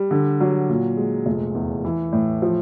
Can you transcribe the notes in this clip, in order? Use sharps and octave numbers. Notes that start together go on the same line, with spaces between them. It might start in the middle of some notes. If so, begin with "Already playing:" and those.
Already playing: G3
D3
F#3
A#2
G#3
F1
E2
E3
A2
F3